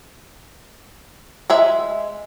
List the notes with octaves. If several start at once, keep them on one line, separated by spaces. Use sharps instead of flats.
G#3 G#4 E5